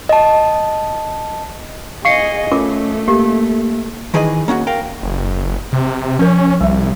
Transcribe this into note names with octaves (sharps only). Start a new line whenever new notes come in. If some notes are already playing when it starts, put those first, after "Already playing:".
D#5 A5
G#4 D#5 F5 C#6 C7 C#7
A3 C#4 F4 A#4 D6
A#3 G4
D#3 E3 G#4 B4 D#5
A#3 C#4 D4 F#4
A#4 F5 G5
F#1
C3
F3 C#4 A#4
C2 G3 E5